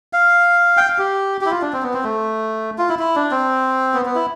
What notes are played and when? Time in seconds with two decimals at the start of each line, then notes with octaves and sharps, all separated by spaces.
0.13 F5
0.77 G5
0.87 F5
0.98 G4
1.41 E4 G4
1.51 F4
1.62 D4
1.73 C4
1.83 B3
1.93 C4
2.04 A3
2.78 F4
2.89 E4
2.99 E4
3.16 D4
3.31 C4
3.94 B3
4.05 B3
4.15 E4